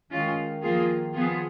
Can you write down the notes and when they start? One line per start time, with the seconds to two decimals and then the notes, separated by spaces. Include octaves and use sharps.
0.10 D#3 G#3 C#4 F4
0.63 F3 A#3 F4 G#4
1.14 F3 B3 F4 G#4